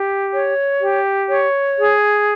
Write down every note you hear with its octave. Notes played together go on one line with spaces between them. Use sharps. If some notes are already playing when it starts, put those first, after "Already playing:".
Already playing: G4
C#5
G4
C#5
G#4